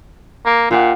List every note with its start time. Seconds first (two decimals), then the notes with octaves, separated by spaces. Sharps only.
0.46 A#3
0.71 A#2 F4 G4 F#5